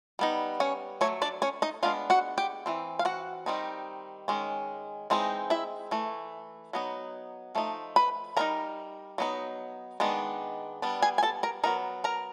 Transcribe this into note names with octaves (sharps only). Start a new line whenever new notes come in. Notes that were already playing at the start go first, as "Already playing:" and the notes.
G3 B3 D#4
C#4 C#5
F#3 A3 C#5
D4 D5
C#4 C#5
D#4 D#5
G#3 B3 D4 F4 F5
F#4 F#5
G4 G5
E3 G#3 C4
F5
F#4 F#5
D#3 G3 C4 D#4
D#3 G#3 C#4
E3 G#3 C4 D#4
E4 E5
E3 A3
F#3 B3 D#4
F3 A3 D#4
B4 B5
G3 C4 D#4 A#4 A#5
F#3 B3 D#4
D#3 G#3 B3 D4
G3 B3 D4
G#4 G#5
G#5
A4 A5
A#4 A#5
F#3 B3 D#4 A#4 A#5
A#4 A#5